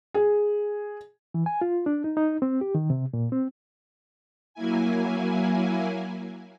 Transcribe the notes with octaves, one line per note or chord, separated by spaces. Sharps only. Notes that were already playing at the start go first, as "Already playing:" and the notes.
G#4
E3
G#5
F4
D4
D#4
D#4
C4
G4
D#3
C3
A#2
C4
F#3 A#3 E4 G#5